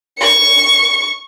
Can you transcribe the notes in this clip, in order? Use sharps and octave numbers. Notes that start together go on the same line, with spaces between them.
C#6 C#7